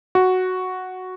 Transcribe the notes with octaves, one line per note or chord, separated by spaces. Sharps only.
F#4